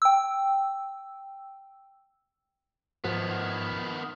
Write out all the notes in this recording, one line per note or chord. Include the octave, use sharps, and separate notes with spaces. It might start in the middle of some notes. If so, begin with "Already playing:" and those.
G5 E6
G#2 D#3 F3 B3